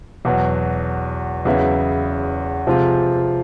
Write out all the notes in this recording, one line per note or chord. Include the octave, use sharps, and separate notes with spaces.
E2 B2 F#3
E2 C#3 F#3 B3 E4
C3 F3 G#3 C4 F4